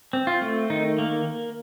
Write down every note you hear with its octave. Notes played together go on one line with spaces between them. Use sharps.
C4
F4
A3
D#3 D#4
A#3